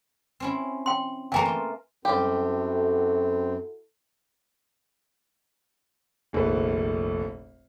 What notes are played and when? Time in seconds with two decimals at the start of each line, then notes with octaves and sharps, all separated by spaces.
0.40 C4 C#4 E4
0.86 G5 C6
1.32 E3 A3 A#3 G5 G#5 A#5
1.45 F4
2.05 F#2 G3 C4 E4 F#4 G4 A4
6.33 F1 A#1 D#3 B4